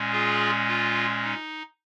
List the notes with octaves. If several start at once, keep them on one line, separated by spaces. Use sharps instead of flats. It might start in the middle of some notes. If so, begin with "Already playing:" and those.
Already playing: A#2 G#3 C#4
F4 G#4
F4
D#4